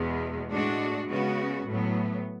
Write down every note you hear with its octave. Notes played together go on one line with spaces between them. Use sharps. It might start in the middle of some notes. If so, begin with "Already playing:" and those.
Already playing: E2 B2 G#3 B3
A2 G#3 D4 F#4
C#3 G#3 B3 F#4
A2 F#3 B3